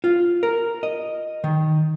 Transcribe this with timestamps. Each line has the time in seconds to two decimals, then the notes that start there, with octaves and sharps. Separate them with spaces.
0.04 F4
0.43 A#4
0.83 D#5
1.44 D#3